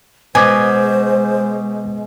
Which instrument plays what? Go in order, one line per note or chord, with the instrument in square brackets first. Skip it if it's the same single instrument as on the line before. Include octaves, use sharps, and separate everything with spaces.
[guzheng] B2 [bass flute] G#3 [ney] C5 [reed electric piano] G#5 D6 G#6